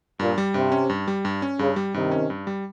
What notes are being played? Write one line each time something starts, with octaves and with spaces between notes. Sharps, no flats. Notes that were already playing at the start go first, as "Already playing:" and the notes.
G2 A#2
G3
G2 C3
C#4
G2
G3
G2
C#4
G2 C#3
G3
G2 C3 D#3
C#4
G2
G3